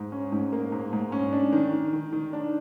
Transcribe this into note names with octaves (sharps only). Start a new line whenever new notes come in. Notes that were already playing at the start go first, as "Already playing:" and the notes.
Already playing: G#2
C#4
G#2
A#3
G#2
G#2
C#4
D4
D#3
D#3
D#3
D#3
D4